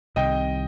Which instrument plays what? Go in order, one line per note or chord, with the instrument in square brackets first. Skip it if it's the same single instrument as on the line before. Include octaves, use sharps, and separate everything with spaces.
[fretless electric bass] C2 C3 D#3 [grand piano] D#5 G5